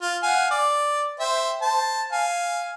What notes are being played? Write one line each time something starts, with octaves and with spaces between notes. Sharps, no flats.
F4
F5 F#5 G#5
D5
C5 E5 G5
C5 A5
F5 G#5